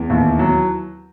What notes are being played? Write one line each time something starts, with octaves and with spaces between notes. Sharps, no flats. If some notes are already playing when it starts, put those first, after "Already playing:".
Already playing: E2
D#2 E4
F#3